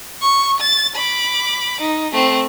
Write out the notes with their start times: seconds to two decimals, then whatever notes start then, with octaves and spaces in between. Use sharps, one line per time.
0.21 C#6
0.60 A6
0.95 B5 D6
1.80 D#4
2.12 A3 C4